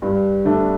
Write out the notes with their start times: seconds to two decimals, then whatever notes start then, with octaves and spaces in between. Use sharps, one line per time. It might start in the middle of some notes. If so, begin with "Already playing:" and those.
0.02 G2
0.44 D3 A3 D4